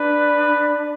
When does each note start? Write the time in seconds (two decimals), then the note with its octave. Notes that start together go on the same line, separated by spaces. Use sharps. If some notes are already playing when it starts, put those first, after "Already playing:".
Already playing: D4 B4 D5